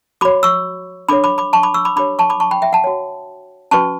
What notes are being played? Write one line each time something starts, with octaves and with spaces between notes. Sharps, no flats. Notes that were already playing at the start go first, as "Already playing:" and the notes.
F#4 C#5 B5 D6
C#6 E6
D4 A4 C#5 B5 D6
B5 D6
B5 D6
A5 C#6
B5 D6
C#6 E6
B5 D6
D4 G4 C#5 B5 D6
A5 C#6
B5 D6
A5 C#6
G5 B5
E5 G5
F#5 A5
F#4 C#5
C#4 F#4 B4 A5 C#6